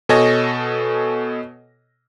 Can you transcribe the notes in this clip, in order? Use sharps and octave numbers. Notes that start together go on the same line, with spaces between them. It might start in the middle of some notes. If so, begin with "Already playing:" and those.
B2 A4 C#5 D#5 G#5 A#6